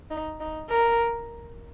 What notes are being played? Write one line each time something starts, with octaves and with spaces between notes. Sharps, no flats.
D#4
D#4
A#4